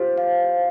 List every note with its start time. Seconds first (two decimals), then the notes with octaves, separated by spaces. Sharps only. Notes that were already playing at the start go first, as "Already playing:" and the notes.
Already playing: F4 G4 C5
0.18 F5